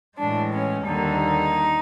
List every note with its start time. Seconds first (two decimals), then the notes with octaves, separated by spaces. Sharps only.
0.17 A2 E3 G#3 D4
0.52 C#4
0.85 D#2 D3 G3 A#3 D#4